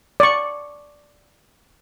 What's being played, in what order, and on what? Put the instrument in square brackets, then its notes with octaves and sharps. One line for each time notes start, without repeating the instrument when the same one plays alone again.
[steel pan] D5 C#6